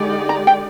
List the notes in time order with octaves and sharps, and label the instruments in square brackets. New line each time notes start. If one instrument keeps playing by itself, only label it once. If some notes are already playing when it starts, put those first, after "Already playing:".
Already playing: [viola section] D3 G#3 D#4 G4 D5
[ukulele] A#5
G5